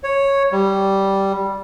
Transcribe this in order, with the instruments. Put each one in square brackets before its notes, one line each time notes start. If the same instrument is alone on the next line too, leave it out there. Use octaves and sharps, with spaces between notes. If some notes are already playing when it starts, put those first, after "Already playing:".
[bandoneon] C#5
G3